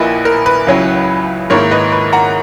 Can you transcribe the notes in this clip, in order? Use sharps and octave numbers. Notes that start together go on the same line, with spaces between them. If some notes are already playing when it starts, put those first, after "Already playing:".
Already playing: A#1 A#2 A#3 E4 B4 D#5
A#4
B4
C#2 C#3 F#3 C#4 E4
G#2 D#3 A#3 E4 A#4 C#5
B4 D#5
B4
F#5 A#5